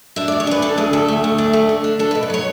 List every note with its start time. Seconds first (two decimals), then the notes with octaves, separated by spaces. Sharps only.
0.16 D4 E5
0.28 D2 D5
0.40 C#5
0.47 D4 B4
0.62 D3 A4
0.78 D2 G#4
0.93 D2 A4
1.08 A3
1.24 D2
1.38 D4
1.53 A3
1.69 D3
1.84 D4
1.99 D4 A4
2.11 B4
2.15 B2
2.23 B4
2.30 F#3 C#5